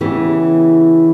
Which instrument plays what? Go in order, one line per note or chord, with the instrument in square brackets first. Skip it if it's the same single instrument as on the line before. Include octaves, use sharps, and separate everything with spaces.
[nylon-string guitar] C#3 E3 B3 G4